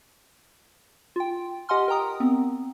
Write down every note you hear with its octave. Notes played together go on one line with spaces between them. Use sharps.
F4 G5
G4 D#5 F#5 G#5 C6 F6
A#4 G5 A#5 D#6
B3 C4